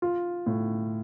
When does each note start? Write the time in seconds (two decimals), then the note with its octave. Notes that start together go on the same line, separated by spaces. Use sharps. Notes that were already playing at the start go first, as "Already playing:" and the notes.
0.02 F4
0.46 A2